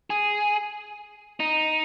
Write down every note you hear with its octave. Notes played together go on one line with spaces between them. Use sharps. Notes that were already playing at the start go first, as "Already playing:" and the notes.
G#4
D#4